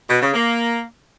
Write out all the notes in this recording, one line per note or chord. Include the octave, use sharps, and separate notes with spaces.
B2
C#3
A#3